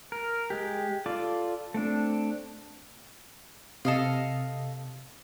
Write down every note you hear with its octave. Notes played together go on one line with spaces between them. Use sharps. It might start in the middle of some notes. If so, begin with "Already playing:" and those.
A#4
G#3 G4
F4 A4 D5 D6
A3 C4 D4
C3 A4 D#5 F5